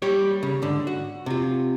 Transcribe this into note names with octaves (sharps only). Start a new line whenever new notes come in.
G3 G4 C#5
C#3
G#2 D3
F#4
C3 F4